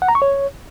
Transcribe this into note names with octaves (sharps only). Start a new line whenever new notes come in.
F#5
A#5
C#6
C#5